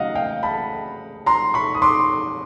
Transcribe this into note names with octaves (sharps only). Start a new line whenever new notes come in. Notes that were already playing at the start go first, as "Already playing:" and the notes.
Already playing: C#3 F#3 A3 D#5 F5 F#5
F5 G5
A5 B5
A#5 C6
B5 C#6
D#6
C6 D6